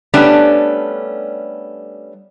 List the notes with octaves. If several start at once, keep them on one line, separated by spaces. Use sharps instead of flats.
G3 A3 B3 C#4 D4 D5